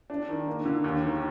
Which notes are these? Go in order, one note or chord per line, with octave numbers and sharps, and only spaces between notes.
D4
D#3
A#3
D3
D#2
D#3